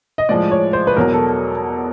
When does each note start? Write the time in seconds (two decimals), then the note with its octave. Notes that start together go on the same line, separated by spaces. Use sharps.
0.18 D#5
0.29 A2 F3 G#3 D5
0.51 C#5
0.73 C5
0.87 B4
0.96 E2 B2 F#3 A#4
1.13 A4